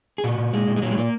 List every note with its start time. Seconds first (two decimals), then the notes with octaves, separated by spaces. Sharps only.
0.18 G#4
0.24 A#2 F#4
0.38 A#2
0.53 A#2 G#3
0.67 A#2
0.76 G#3
0.82 A#2 F#3
0.91 G#3
0.98 A#2 A#3